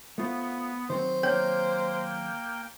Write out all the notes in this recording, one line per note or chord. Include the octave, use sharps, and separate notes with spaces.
A3 B3 F4 C5
D#3 F#3 C4 C5
A#3 C#5 G5